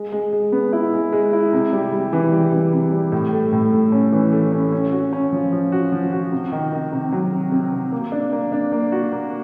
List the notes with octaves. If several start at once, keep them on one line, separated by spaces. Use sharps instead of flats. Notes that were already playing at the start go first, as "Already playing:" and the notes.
Already playing: G#3
G#3
G#3
B3
E4
G#3
G#3
E4
C3
G3
G3
E3
G3
E3
C3
G3
A2
A3
A2
A3
C#4
E3
A3
C#4
C#4
F#4
C#4
F3
F3
F#4
F3
F#4
C3
D#3
D#3
C3
F#3
C3
C3
C3
A#3
D4
A#3
D4
A#3
F#4
A#3